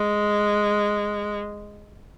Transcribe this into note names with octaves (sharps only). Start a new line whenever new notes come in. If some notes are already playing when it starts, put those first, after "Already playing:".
Already playing: G#3